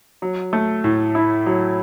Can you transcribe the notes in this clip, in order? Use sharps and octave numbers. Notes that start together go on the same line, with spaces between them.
F#3
A3
A2
E4
F#3